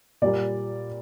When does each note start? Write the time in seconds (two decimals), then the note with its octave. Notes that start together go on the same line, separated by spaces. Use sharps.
0.22 A#2 G3 A#3 D5